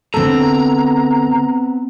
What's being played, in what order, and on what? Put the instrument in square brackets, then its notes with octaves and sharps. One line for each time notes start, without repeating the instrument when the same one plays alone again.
[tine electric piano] D3 A4 [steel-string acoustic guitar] B3 C4 [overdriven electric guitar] A#5